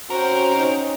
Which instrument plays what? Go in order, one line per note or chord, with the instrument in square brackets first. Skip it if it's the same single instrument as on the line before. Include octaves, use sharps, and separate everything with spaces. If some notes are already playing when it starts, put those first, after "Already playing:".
[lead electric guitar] C3 A#4 [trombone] C#4 [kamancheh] F#4 G5 [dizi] C5
[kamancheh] D#4